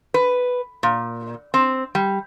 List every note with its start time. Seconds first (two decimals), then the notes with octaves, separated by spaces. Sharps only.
0.14 B4
0.83 A#2
1.54 C4
1.95 G3